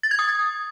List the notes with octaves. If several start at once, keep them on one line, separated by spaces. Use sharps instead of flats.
A6
G#6
D#6